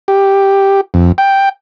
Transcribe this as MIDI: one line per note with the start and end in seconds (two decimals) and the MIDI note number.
0.08 0.81 67
0.94 1.12 41
1.18 1.49 79